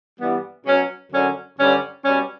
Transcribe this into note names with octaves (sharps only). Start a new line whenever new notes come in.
G2 E3 G3 B3
B2 F#3 C#4
F#2 D3 F#3 C#4
G2 D3 G3 C#4
B2 G3 C#4